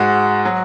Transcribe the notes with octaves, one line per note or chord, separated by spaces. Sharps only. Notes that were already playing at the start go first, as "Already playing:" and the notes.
Already playing: G#2 G#3 F#4
F#3